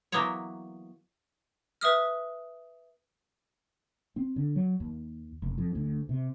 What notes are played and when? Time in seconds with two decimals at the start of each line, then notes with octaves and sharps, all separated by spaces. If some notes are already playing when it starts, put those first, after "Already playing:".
0.12 E3 F#3 A#3 B3 C5 C#5
1.81 B4 E5 D#6 F6
4.16 C4
4.36 D3
4.56 F#3
4.80 D#2
5.42 F1
5.58 F2
5.75 D2
6.09 C3